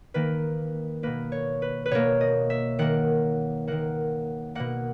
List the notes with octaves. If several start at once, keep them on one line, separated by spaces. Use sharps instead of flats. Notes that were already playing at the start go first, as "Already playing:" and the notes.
D#3 A#3 B4
B2 A#3 B4
C#5
B4
B4
B2 A#3 C#5
D#5
E5
D#3 A#3 F#5
D#3 A#3 F#5
B2 A#3 F#5